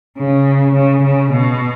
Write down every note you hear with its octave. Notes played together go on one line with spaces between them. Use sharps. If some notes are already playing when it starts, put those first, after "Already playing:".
C#3
C#3
C#3
B2